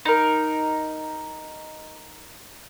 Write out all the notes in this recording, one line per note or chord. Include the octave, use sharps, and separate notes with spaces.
D#4 A#4